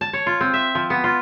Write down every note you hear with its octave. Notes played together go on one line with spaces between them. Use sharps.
A5
C#5
F4
C4
E5
F3
B3
F4